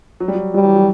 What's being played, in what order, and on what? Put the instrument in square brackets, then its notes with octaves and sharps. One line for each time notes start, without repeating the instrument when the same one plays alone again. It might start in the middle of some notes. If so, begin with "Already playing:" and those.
[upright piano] F#3
G3
F#3
[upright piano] F#3 [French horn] G3
[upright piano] E3
F#3